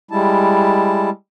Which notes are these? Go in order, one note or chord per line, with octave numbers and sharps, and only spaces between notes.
G3 G#3 E4 A5